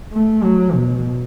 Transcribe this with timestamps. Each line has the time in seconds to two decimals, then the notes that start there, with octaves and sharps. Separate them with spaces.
0.13 A3
0.44 F#3
0.75 B2